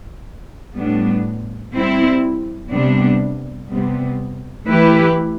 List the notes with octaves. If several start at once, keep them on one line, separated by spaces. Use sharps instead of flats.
A2 G3 B3 D4
G3 C4 E4
C3 G3 B3 D4
C3 G3 B3
E3 A3 E4 G4 B4